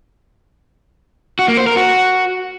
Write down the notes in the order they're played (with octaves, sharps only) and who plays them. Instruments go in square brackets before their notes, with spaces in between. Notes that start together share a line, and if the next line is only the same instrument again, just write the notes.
[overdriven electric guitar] F#4
A#3
C5
A#4
F#4